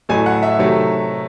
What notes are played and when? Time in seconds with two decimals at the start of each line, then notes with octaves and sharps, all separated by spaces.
0.09 A1 A2 F#3 A3 G#5
0.26 F#5
0.43 E5
0.59 C3 D#3 F#3 A3